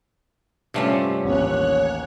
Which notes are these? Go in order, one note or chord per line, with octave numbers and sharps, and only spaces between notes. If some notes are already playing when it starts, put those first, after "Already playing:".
G2 C3 F3 G3 A3 C#4
A1 D#2 C#5 F#6